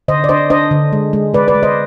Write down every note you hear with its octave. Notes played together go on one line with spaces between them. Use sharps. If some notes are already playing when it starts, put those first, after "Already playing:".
D3 C5 D#5
D5
D4 C5 D#5
D4 C5 D#5
D3
G#3
G#3
G#3 B4 D5
B4 D5
G#3
C5 D#5